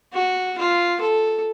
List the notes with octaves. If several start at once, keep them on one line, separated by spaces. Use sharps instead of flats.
F#4
F4
A4